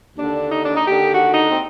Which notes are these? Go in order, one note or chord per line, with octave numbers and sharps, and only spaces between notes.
D#2 D3 D4
D#4
D4
D#4
D#2 D3 G4
F#4
D#4
C4